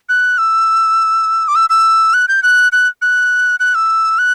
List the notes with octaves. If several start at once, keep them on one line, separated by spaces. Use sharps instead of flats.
F#6
E6
D6
E6
E6
F#6
G6
F#6
F#6
F#6
F#6
E6
F#6